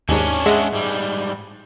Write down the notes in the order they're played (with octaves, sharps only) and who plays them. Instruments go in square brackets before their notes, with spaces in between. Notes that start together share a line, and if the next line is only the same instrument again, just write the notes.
[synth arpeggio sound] D#2 G#2 [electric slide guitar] C#4 D4
[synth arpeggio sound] G#3 E5 F#5
[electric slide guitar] G#2 G3